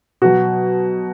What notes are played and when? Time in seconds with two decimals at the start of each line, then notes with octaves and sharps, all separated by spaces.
0.22 B2 F#3 F#4